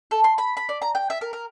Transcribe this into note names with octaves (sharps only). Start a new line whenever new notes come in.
A4
C6
B5
B5
D5
A#5
G5
E5
A#4
A#4